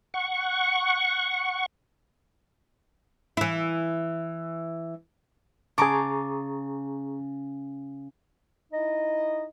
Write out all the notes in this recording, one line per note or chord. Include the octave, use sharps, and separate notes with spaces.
F#5 C#6
E3 E4
C#3 G#4 A5 A#5 C#6 D6
D#4 E4 D#5